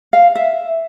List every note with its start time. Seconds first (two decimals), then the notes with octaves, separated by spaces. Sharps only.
0.13 F5
0.35 E5